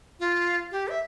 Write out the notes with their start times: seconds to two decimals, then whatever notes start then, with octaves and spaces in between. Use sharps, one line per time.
0.20 F4
0.71 G4
0.88 E5